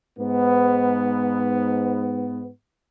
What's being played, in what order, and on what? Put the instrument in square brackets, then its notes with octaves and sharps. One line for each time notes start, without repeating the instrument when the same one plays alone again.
[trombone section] G#2 B3